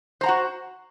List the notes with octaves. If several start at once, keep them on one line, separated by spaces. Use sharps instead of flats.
F#4 C5 F#5 A#5